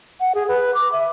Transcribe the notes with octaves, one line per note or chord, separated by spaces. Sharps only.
F#5
G#4
B4
D6
E5